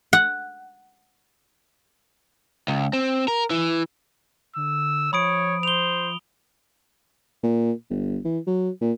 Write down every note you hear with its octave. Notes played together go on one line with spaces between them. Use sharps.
F#5
C#2
C4
A#4
E3
D3 E6
F3 C#5 B5 D#6 D7
C5 F7 G7
A#2
G1
E3
F#3
A#2